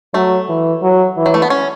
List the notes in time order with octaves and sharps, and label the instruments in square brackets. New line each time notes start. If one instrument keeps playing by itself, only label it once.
[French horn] F#3 [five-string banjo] A3
[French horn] E3
F#3
E3
[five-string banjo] F#3
A3
B3
C#4